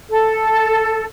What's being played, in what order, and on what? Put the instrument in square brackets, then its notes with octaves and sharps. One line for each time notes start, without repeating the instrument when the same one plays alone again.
[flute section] A4